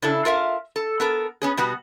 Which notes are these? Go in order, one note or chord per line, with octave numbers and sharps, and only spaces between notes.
C#3 D4 E4 A4
F4 A#4 E5 F5
A4
B3 A4 A#4
B3 C#4 G#4
B2 G3 B3 F#4